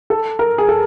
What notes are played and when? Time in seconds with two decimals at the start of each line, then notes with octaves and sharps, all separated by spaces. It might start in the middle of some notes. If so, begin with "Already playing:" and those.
0.10 A4
0.39 A#4
0.58 G#4
0.69 A4